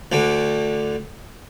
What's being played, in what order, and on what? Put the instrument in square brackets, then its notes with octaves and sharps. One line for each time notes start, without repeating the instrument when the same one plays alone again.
[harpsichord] D2 D3